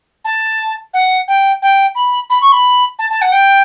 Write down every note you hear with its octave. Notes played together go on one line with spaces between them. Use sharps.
A5
F#5
G5
G5
B5
B5
C#6
B5
A5
A5
F#5
G5